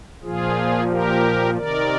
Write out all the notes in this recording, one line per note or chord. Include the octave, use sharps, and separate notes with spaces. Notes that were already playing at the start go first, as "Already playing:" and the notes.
A#2 F3 F4 G#4
G4 A#4
C3 D#3 A#4 D5